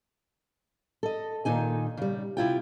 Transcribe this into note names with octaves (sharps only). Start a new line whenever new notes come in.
A4 D#5
A#2 D#3 D#4 G#5
C#3 G3
C3 E4 F4 G5